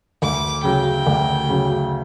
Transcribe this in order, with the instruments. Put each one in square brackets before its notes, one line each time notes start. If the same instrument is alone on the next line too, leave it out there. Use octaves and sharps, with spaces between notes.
[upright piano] D2 [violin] D6
[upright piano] C#3 F#3 [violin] G5
[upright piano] D2
C#3 F#3